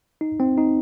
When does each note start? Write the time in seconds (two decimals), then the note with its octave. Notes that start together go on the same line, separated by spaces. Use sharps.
0.21 D#4
0.40 C4
0.58 D#4